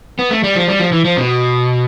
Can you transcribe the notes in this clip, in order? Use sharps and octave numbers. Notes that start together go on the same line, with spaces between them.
B3
A3
G3
F3
G3
F3
E3
F3
B2